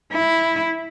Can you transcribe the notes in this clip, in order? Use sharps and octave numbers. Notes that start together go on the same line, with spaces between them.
E4